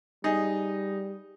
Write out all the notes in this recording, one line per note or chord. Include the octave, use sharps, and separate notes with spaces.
G3 D#4 G#4